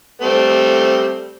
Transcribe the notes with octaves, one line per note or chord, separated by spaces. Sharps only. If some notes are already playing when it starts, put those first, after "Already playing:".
G3 A3 C4